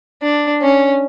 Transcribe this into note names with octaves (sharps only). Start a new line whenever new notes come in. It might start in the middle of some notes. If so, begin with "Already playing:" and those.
D4
C#4